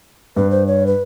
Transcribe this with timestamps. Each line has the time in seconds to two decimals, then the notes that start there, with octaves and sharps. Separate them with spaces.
0.36 G2 B4
0.51 C5
0.67 C#5
0.87 B4